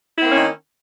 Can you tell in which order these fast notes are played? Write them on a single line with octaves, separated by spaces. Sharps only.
E4 C4 A#3 C#4 D#3